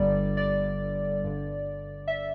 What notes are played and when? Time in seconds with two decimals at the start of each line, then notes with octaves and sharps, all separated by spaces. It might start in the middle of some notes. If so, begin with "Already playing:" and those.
Already playing: G1 G2 D3 G3 D5
0.37 D5
1.22 G1 G2 D3
2.08 E5